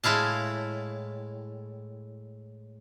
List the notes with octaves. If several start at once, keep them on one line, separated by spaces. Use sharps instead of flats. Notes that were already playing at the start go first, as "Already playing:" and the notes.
A2 G#3 E4 F5 A5